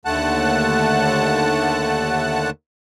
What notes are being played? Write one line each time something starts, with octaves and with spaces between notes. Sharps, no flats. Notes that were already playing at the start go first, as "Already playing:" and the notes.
D#2 D3 A3 F#5 A5 F#6